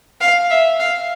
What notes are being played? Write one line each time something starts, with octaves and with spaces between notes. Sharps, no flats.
F5
E5
F5